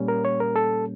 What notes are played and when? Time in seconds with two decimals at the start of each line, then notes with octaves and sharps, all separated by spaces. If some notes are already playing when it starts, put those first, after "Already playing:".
Already playing: A#2 G3 A#3 C#4
0.08 A#4
0.25 C#5
0.40 A#4
0.56 A4